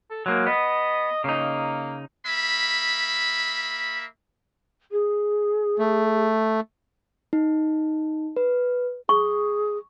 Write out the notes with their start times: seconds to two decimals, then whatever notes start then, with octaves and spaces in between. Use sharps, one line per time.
0.10 A4
0.26 F#3 G#3 A#3
0.46 B3 D#5
1.24 C#3 A#3 D#4
2.26 A#3 E5 B5
4.91 G#4
5.79 A3
7.33 D#4
8.36 B4
9.09 G#4 C#6